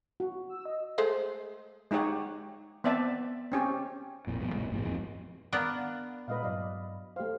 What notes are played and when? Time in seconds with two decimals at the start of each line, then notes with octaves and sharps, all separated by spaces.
0.20 F#4
0.49 E6
0.65 D#5
0.98 G#3 A3 C5
1.91 G#3 D#4 G4 C#5 F#5
2.84 B3 C4 D5 E5 A5
3.52 C4 C#4 G4
4.27 A#1 F2 A#2
4.40 A1 F#2 B2 B3
4.54 C#2 A#2 G#3
4.70 A1 G#2 B2
4.84 F2 G#2 F3 G#3
5.53 B3 D4 A#4 F5 F#5 B5
6.28 A#2 G#3 B4 D#5 F5
6.43 G2 F#3 D5 D#5 F5
7.16 A3 G4 C5 F5